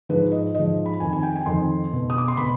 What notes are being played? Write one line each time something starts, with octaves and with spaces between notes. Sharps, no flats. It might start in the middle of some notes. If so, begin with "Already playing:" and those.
G#2 F3 B4
D#5
G#2 F3 D#5
B5
F2 D#3 G#5
G#5
G5
G#5
F2 D#3 C6
B2
D#6
D6
C6
B2 B5